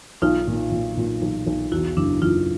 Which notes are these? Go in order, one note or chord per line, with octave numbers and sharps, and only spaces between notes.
B1 D#4 F4
A#2
A#2
A#2
B1
B1
E2 E4 F#4
F#1 D4 E4
F#1 D#4 F4